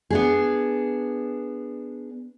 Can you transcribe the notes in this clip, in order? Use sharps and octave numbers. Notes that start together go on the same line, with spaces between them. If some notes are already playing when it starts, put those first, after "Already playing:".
B3 D4 G#4